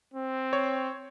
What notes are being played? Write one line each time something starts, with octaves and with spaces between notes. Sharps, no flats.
C4
C#5